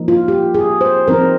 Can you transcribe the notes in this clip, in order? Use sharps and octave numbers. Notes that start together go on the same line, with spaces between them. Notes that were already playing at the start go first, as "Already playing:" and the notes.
Already playing: F3 A#3 D#4
F4
G4
G#4
C5
F3 C4 D#4 A#4